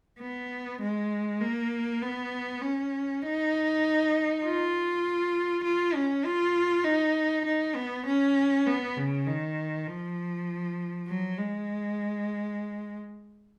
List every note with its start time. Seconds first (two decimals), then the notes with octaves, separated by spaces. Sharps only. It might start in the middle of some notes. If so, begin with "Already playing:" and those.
0.20 B3
0.81 G#3
1.41 A#3
2.02 B3
2.62 C#4
3.22 D#4
4.44 F4
5.64 F4
5.95 C#4
6.25 F4
6.85 D#4
7.45 D#4
7.76 B3
8.06 C#4
8.67 B3
8.97 C#3
9.27 D#3
9.88 F3
11.08 F#3
11.38 G#3